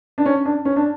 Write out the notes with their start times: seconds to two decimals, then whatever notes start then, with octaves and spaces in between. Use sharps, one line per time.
0.18 D4
0.26 C#4
0.45 D4
0.65 C#4
0.76 D4